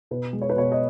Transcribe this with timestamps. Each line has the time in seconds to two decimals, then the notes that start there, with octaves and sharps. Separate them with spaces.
0.11 B2 B4
0.33 G#3
0.42 C#5
0.50 B4
0.56 B2 C#5
0.72 D#5